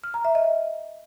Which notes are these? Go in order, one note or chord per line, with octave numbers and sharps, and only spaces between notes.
F6
A#5
E5
D#5